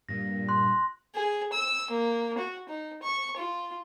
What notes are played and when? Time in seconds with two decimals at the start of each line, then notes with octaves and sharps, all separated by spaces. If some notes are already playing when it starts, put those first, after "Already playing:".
0.09 G2 A#2 A#6
0.49 C6 F#6
1.14 G#4
1.53 E6
1.90 A#3
2.38 F#4
2.68 D#4
3.02 C#6
3.37 F4